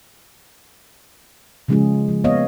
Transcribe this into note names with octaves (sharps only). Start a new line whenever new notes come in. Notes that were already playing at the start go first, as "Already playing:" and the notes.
C#3 F3 G#3 C#4 F4 G#4
F3
A#3 B3 C#5 D#5 F5